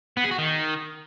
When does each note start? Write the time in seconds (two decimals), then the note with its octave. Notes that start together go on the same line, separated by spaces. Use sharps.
0.17 B3
0.24 G#4
0.31 F#4
0.39 D#3